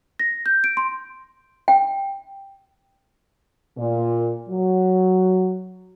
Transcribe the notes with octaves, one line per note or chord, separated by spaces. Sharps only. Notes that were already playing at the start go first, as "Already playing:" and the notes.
A#6
G6
D7
C6
G5
A#2
F#3